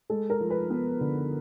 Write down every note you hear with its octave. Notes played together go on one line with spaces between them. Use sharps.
G#3 A4
A#4
F3
B4
B3
D3